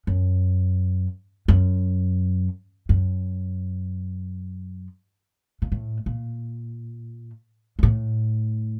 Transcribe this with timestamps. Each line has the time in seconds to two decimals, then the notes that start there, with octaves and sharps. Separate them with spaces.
0.07 F#2
1.48 F#2
2.89 F#2
5.62 A#2
5.72 A2
6.06 A#2
7.79 F#2
7.83 A2